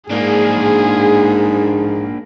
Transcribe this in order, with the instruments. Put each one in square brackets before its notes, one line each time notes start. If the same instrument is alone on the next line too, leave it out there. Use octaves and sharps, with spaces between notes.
[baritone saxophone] G#2 [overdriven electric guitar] A#3 D4 [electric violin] G#4